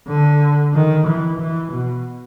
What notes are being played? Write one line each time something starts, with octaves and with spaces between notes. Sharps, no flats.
D3
D#3
E3
E3
B2